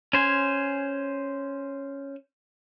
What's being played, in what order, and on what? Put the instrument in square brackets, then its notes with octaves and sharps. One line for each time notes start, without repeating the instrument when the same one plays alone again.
[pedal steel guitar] C#4 C5 G#5